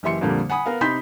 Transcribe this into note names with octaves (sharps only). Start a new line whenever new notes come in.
F#1 E3 G4 E5 C6 C#7
F2 A#2 D3 G3 A#3
F#5 G#5 B5 D#6
B3 A#4 F5
C3 D#4 B5 C6 G6 B6